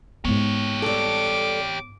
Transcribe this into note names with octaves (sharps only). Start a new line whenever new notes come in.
G#2 B3 G4 C#5
G3 A4 D6